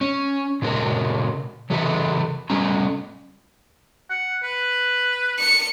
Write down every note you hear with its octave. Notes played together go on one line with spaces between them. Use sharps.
C#4
A#2 C#3 D4 G#4 A#4
C#3 E3 G4 A4 E5
G3 A3 C#4 A#5
F#5
B4
C#7